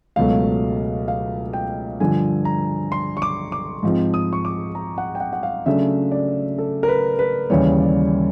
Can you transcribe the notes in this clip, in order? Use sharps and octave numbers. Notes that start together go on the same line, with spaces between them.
C#2 B2 F#3 A3 F5
F5
G5
G2 D3 F3 G#5
A#5
C6
C#6
D6
D6
G#2 F3 G#3 C4
D#6
C#6
D6
A#5
F#5
G5
F#5
F#5
F5
C#3 F#3 A3 D4 E5
D5
A4
A#4
B4
B4
D#2 C#3 E3 G3 C#5
D5